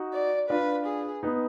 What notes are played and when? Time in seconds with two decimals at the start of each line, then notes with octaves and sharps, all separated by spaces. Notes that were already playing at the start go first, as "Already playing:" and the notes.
Already playing: D#4 F#4
0.13 D5
0.50 D4 F4 B4
0.86 G#4
1.23 B3 D#4